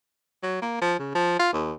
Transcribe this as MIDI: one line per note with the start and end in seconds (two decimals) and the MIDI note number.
0.43 0.62 54
0.62 0.77 58
0.82 0.96 53
0.99 1.12 49
1.15 1.39 53
1.39 1.52 65
1.53 1.73 39